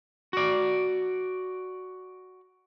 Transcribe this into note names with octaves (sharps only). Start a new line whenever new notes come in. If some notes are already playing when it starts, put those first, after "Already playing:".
F#4 D5